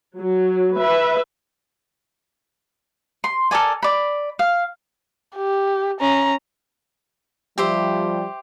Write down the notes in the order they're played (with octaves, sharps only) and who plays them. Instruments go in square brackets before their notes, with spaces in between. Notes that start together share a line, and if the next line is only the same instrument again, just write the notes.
[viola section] F#3
B4 E5
[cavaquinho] C6
A4 A#4 D5 G#5
D5 B5
F5
[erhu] G4
[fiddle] C#4 [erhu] A#5
[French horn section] F3 G3 [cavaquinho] G4 C5 E5